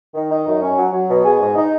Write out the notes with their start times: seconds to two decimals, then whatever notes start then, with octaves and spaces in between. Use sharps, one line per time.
0.15 D#3
0.30 D#4
0.46 F#2
0.61 C#4
0.78 F#3
0.93 F#3
1.09 B2
1.24 G#4
1.40 G#2
1.55 D#4